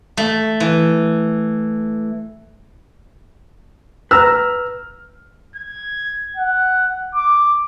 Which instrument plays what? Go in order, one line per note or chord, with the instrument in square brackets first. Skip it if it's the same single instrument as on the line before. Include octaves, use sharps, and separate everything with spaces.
[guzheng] A3
E3
[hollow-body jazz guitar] B4 A#5 [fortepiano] E6 [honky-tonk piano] F6
[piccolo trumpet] G#6
F#5
D6